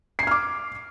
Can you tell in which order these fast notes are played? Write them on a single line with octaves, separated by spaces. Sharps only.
C7 G#6 F6 D6